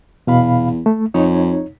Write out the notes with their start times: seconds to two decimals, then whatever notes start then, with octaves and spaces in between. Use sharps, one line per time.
0.27 E2 B2 F5 B5
0.86 A3
1.14 F2 D#4 C#5